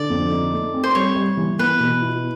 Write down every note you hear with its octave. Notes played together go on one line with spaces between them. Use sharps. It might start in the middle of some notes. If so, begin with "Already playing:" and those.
Already playing: D3 D5
F2
D#4
A3
C4
C5
G3 C#5
G3
E3
B3 B4
B2
E4